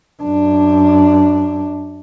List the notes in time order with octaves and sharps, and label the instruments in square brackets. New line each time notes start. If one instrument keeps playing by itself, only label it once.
[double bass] F#2 D4